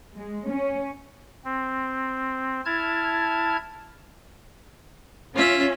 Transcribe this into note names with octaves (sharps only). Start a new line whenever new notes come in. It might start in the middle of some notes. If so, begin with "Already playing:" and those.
G#3
C#4
C4
E4 A5 F6 G#6
C#4 F4 E5